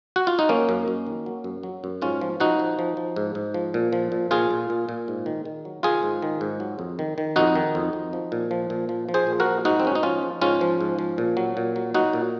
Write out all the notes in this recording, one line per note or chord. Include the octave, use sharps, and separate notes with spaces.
F#4
F4
D#4
F#3 A#3 C#4
F#2
F#2
D#3
F#3
F#2
F#3
F#2
G#2 C#4 F4
F3
F3 D#4 F#4
F3
F3
F3
G#2
G#2
F3
A#2
F3
A#2
A#2 F4 G#4
A#2
A#2
A#2
G#2
D#3
D#3
F#3
D#3 F4 G#4
G#2
D#3
G#2
F#3
F2
D#3
D#3
F2 D#4 F#4
D#3
F2
F2
F3
A#2
F3
A#2
F3
F3
G#4 C5
A#2
F#4 A#4
F3
G#2 D#4 F#4
C4
G#2 C#4
D#4
F3 C#4 F4
F3
G#2 C#4 F4
F3
G#2
F3
A#2
F#3
A#2
F#3
F#3 D#4 F#4
A#2